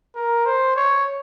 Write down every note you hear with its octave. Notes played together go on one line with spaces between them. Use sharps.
A#4
C5
C#5